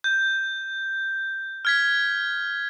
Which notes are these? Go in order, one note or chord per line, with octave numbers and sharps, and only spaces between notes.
G6
F6 G#6 B6